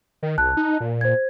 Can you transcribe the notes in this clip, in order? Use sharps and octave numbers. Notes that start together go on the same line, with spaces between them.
D#3
C2 A5 F#6
D#4
A#2
C5 G#6